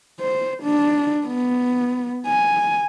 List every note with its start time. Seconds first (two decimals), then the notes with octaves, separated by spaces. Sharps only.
0.20 C5
0.63 D4
1.27 B3
2.27 G#5